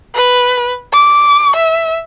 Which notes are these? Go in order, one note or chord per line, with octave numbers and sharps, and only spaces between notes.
B4
D6
E5